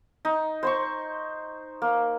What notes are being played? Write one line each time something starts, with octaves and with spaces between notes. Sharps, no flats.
D#4
C5 C6 C#6
A#3